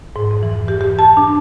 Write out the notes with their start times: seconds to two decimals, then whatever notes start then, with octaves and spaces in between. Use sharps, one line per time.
0.16 G#2
0.31 F2
0.43 E3
0.68 G4
0.81 G4
0.99 A5
1.17 D4